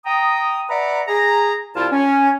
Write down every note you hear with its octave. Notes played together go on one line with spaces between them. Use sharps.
G5 A#5 D#6
B4 D5 E5 F#5 A#5
G#4 A#5
C2 E4 F4 D5 F5 A5
C#4